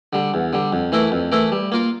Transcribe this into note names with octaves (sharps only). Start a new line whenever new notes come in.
D3 G3
E2
D3 G3
F2
E3 A3 E4 A#4
F2
E3 A3 E4 A#4
G3
A#3 F4 A#4